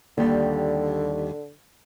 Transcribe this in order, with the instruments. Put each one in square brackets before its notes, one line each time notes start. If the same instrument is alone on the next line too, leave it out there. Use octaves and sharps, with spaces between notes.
[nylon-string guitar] D#2 G3 [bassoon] D3